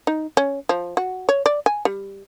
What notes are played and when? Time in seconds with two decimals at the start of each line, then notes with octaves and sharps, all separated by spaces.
0.07 D#4
0.37 C#4
0.69 F3
0.97 F#4
1.29 C#5
1.46 D5
1.66 G#5
1.85 G3